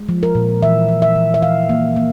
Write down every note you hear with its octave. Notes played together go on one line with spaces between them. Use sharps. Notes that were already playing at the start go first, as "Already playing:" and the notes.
Already playing: G#3
F3
A#4
A#2
E3 E5
E3
E5
E3
E5
E3 F5
A#3
A#3